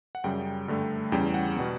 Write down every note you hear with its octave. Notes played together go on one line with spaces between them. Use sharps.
F#5
F#2 C#3 G3 G5
G2 D3 A3
E2 C#3 G3 C#4 G5
F#5
B2 G3 B3